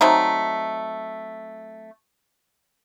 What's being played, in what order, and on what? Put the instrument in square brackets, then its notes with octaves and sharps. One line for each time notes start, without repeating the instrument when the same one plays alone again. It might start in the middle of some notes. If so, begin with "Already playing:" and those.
[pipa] F#3 A3 C4 D#4